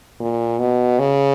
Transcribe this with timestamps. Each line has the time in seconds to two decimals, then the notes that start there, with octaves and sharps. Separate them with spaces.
0.20 A#2
0.59 B2
0.99 C#3